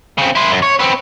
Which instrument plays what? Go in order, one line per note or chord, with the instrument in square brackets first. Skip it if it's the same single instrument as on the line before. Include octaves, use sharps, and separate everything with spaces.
[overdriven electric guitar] C#3 C4
E4 C5
F#2
C#5
B3 C4